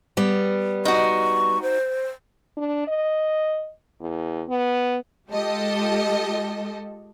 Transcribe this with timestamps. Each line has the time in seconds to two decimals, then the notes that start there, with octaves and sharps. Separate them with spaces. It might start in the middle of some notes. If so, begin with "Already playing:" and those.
0.17 G3 B3
0.85 D#4 F#4 C#6
1.63 C5
2.57 D4
2.87 D#5
4.00 E2
4.49 B3
5.30 G#3 F4 G4 A4 D#5